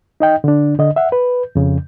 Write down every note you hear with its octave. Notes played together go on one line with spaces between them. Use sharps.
D#4 D#5 G5
D3 D4
D3 D#5
E5 F#5
B4
F2 C#3